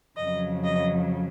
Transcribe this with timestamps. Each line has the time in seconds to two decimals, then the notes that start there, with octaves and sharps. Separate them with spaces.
0.17 F2 C#3 F#3 D#5
0.64 D#5